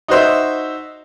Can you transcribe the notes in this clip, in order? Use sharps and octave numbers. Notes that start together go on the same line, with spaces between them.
D#4 F#4 C5 E5